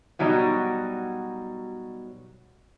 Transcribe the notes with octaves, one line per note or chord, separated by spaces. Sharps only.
B2 F#3 G3 D#4